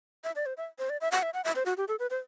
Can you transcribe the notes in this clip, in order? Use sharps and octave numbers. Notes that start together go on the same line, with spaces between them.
E5
D5
C5
E5
C5
D5
E5
F#5
E5
F#5
E5
C5
F#4
G4
A4
B4
C5